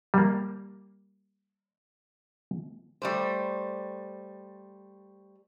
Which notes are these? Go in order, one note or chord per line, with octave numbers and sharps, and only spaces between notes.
G3 A#3
G3 A3 C5